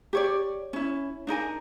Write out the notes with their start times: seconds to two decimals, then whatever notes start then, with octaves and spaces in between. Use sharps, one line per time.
0.13 G4 C#5 D5
0.73 C#4 E4
1.27 D4 D#4 A#4 G#5